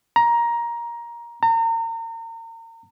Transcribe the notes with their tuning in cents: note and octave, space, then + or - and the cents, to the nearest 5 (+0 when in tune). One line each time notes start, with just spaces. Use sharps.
A#5 +15
A#5 -35